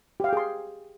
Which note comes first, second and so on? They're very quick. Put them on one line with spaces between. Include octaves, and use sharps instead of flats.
G4 F5 G5 G#4 C6